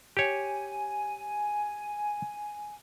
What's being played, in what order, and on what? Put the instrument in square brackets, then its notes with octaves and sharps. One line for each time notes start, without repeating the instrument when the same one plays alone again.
[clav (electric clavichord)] G4 C#5 [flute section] G#5